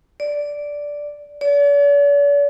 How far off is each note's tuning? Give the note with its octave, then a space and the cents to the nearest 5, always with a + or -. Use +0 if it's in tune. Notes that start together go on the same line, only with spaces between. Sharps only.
D5 -5
D5 -45